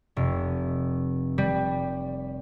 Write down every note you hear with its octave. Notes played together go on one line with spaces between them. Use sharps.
F1
G3